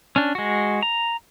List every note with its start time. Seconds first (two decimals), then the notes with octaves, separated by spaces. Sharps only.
0.16 C#4 D4
0.35 G#3 F#4
0.83 A#5